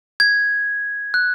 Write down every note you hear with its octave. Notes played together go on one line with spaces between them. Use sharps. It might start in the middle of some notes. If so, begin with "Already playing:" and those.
G#6
F#6